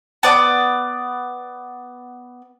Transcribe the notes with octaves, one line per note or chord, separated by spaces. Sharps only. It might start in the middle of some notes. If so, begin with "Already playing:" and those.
B3 D5